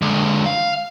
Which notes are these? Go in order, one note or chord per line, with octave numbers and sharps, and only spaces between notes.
D3 G#3
F5